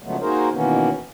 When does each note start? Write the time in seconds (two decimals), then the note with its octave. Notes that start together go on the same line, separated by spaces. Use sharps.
0.02 C#3 F3 F#3 G#3 A3 B3
0.21 A#3 D#4 F#4 G#4 A#4 C5
0.52 B2 D#3 E3 A#3 B3 C#4